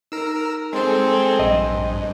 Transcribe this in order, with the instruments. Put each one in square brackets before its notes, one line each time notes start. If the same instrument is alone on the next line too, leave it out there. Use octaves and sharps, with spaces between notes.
[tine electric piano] D#4 [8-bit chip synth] A#4 E6
[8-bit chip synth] G#3 A4 [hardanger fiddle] C4 G#4
[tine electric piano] A#1 [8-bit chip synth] G2 [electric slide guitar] D#5